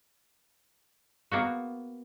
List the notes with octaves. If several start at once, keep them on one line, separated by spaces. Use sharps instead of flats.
A#3 B3 F#4